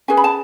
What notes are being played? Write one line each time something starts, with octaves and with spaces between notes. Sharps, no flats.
C#4 G#4 B4 G#5
B5
A5